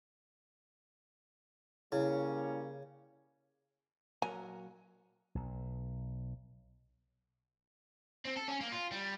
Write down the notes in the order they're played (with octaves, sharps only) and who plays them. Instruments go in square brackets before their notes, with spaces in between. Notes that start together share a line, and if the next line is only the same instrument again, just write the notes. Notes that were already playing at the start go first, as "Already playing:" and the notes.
[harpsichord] C#3 [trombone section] G3 A#3 C#4 [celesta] E4
[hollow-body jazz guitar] A#2 F#3 A#4 [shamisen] G#5
[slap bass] B1
[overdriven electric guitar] C4
A4
C#4
A#3
F4
G3